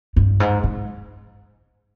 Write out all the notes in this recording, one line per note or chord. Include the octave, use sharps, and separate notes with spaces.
G2
G#2
G#2